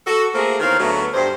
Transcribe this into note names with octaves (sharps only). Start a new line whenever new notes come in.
F#4 A4
A3 A#3 C4 F4 G#4 A#4
E2 D#3 C4 A#4 C#5 F5
D2 F#3 A3 B3
G2 C5